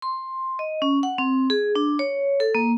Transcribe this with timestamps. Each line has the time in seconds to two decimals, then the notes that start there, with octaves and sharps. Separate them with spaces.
0.02 C6
0.59 D#5
0.82 C#4
1.03 F#5
1.18 C4
1.50 G#4
1.75 D4
1.99 C#5
2.40 A4
2.55 A#3